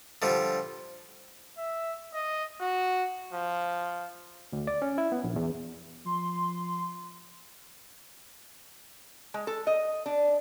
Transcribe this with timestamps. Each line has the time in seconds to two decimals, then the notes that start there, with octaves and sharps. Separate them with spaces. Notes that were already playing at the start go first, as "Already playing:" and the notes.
0.22 D3 F3 G3
1.58 E5
2.13 D#5
2.61 F#4
3.33 F3
4.53 D2
4.67 D5
4.82 C#4
4.98 E4
5.12 B3
5.24 A#1
5.36 E2
6.06 F3 C6
9.34 G#3
9.47 A4
9.67 D#5
10.06 D4